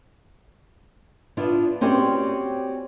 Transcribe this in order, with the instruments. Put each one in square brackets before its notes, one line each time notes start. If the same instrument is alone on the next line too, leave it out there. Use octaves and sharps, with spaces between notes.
[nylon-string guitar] B3 D4 E4 F4
C4 C#4 F#4 G4 C5 D5